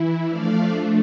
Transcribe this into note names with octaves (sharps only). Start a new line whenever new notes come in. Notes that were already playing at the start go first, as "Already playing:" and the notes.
Already playing: E3 E4
F3 A3 D4 D5 F5